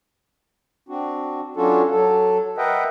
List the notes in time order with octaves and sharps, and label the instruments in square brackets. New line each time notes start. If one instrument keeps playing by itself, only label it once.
[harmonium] C4 D4 F#4
F#3 C#4 D4 F4 F#4 A4
F#3 A4
A#4 B4 D#5 E5 F#5 G5